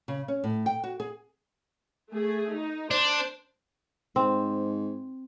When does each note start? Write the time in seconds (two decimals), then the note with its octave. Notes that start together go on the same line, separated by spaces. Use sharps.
0.08 C#3
0.28 C#4
0.44 A2
0.66 G5
0.83 F#4
1.00 G#4
2.12 A3 G#4
2.52 D#4
2.91 D4 C5
4.16 G#2 C4